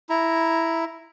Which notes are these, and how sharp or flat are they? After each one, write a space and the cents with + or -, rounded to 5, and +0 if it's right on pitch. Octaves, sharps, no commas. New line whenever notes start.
E4 +0 A#5 +5